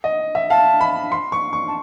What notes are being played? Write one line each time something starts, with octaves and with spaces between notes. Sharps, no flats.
D#5
E5
F5 A5
B5
C6
C#6
C#6
A5